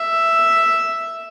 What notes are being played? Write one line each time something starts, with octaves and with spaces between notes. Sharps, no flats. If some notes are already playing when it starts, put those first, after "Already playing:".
Already playing: E5